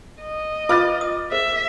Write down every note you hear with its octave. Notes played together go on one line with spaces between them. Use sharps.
D#5
F4 B4 F5 D6 F6 A6
D#6
G#4 A#4 C5 E5